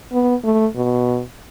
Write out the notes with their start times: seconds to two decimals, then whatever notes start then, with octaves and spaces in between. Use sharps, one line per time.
0.12 B3
0.44 A3
0.76 B2